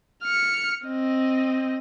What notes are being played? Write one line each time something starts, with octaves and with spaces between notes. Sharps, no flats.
F6 C#7
C4 D#5